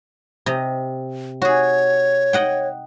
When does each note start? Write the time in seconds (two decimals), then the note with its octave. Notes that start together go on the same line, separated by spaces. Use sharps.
0.46 C3 D#5
1.42 F#4 G#4 C#5
2.33 D#5 F#5 G5